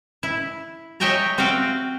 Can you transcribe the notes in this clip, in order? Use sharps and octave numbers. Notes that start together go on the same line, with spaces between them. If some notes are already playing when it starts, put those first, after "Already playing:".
E4
C#5 D#5 E5 G5 G#5 A#5
C4 F#4 E5 F5 G5